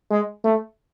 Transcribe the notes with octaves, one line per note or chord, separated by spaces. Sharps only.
G#3
A3